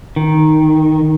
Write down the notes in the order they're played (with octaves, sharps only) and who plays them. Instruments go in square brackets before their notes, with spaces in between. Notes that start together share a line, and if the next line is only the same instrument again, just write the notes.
[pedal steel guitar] D#3